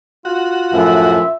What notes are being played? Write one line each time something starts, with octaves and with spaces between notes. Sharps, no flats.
F4 F#4
F#2 A2 F3 E5